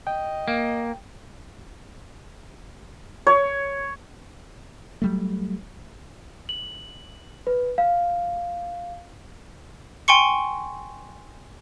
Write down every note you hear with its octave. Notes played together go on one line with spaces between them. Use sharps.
D#5 G5
A#3
C#5
F#3 G3 A3
F#7
B4
F5
G5 G#5 C6 C#6 C#7